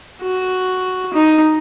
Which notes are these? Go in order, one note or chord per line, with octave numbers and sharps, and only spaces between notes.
F#4
D#4